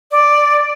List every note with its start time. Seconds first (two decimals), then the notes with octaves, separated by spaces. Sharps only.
0.11 D5